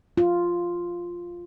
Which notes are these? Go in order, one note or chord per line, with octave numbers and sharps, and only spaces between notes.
F4